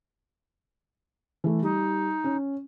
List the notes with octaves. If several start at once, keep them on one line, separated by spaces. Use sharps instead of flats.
E3 A3
G3 D#4
C#4